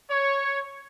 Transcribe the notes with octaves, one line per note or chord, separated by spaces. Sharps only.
C#5